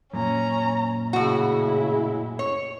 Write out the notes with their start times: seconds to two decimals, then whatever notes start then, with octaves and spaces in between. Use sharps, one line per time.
0.13 F#2 A#2 C#4 A#5
1.13 A2 C#3 G#3 E4 F#4
2.39 C#5